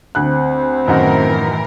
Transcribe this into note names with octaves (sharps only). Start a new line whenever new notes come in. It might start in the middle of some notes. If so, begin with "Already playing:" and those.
D2 C4 F#6
F#2 A2 D#3 E3 A#4 F#5